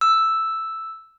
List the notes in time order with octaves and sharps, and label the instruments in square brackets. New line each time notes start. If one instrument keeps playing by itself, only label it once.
[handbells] E6